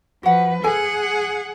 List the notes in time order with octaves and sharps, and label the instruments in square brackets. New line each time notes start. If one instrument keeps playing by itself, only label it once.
[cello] F3 B4 [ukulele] F#4 F#5
[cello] G#4 F#5 [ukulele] A4 G#5